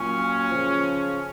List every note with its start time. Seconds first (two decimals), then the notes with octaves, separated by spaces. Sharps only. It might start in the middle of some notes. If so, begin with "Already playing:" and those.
Already playing: A#2 F#3 C#4
0.50 C#3 F3